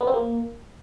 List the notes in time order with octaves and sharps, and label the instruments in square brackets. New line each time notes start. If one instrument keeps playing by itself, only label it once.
[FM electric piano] B3
C4
A#3